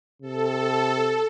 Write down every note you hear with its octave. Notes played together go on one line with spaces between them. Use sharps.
C3 A4